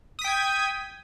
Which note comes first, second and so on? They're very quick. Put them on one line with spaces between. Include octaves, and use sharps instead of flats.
D#6 B6 G5 G#6